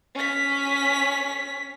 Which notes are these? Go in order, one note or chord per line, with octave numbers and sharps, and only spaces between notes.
C#4 B6